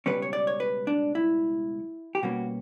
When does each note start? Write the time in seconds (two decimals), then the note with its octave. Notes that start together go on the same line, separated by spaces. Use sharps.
0.06 C#2 B2 G3 C#4 B4
0.22 C#5
0.33 D5
0.47 C#5
0.60 B4
0.87 D4
1.15 E4
2.15 G4
2.23 B2 G3 A#3 C#4 F#4